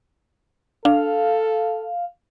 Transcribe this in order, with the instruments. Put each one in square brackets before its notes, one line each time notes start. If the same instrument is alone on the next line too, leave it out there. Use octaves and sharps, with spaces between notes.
[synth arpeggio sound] D4 [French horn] A4 [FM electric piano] F5